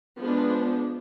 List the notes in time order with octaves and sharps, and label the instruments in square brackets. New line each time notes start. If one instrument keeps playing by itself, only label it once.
[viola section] F3 G#3 B3 D4